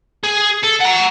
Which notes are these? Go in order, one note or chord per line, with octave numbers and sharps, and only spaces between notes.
G#4
A4
F#5 A#5